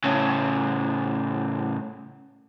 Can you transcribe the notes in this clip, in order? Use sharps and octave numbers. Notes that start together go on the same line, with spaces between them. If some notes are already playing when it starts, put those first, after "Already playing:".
A2 C#3